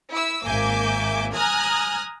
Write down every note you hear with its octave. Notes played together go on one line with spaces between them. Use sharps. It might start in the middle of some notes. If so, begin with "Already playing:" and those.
E4 E6
G#1 A#3 E5 G#5 D6 G6
G#5 A#5 D#6 F6 F#6 G#6